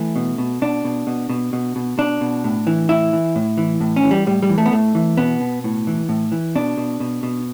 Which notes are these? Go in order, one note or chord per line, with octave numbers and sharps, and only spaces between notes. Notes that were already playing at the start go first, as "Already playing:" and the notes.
Already playing: E3 A3
B2
B2
B2 D4
B2
B2
B2
B2
B2
B2 D4
B2
A2
E3
A2 E4
E3
A2
E3
A2
C#4
E3
G3
A2 G3
G3
E3
A3
B3
A2 A3
E3
B2 B3
B2
A2
E3
A2
E3
B2 D4
B2
B2
B2